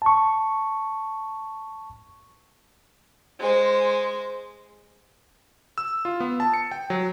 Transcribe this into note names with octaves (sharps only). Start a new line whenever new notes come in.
A5 C#6
G#3 C5
E6
F4
B3
A5
C#7
G5
F#3